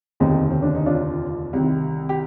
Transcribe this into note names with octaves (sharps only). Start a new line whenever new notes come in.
F1 D#2 D3 C4 D#4
C4
D4
D#4
D4 F4
C2 C3 D#3
G4